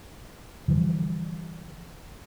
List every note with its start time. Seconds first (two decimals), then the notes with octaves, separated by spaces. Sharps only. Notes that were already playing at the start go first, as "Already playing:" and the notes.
0.68 D3 E3 F3 G3